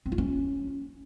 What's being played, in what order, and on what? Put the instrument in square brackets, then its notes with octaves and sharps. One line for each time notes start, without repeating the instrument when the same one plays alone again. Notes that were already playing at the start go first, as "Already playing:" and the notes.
[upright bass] C4
F4
C#4